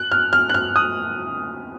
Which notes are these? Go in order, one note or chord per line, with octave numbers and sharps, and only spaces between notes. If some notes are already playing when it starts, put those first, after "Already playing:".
Already playing: F#6
F6
F6
F#6
F6
D#6